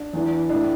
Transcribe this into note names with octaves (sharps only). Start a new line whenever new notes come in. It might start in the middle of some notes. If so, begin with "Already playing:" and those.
Already playing: D4
E2 E3
A2 E3 D4